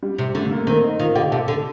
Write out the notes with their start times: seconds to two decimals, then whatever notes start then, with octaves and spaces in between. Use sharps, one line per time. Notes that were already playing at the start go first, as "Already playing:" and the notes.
0.03 G3
0.18 C3
0.35 D3 A3
0.51 A#3
0.67 D#3 C4
0.84 D#4
0.99 D#3 F4
1.15 D3 G4
1.31 C3 A4
1.48 D3